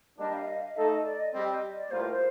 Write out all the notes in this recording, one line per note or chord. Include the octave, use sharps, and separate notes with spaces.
G3 A#3 D4 D#5
F5
D#5
F5
A3 D#4 A4 D#5
D#5
D5
D#5
G3 C4 G4 D#5
D#5
D5
A2 G3 A#3 F4 C5
A#4
C5